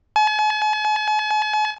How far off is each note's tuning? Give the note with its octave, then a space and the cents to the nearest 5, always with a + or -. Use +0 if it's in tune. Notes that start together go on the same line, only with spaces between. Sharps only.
G#5 +45